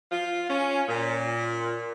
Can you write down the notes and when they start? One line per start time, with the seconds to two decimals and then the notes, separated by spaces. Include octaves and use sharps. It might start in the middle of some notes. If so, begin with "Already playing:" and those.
0.11 F4
0.49 C#4
0.89 A#2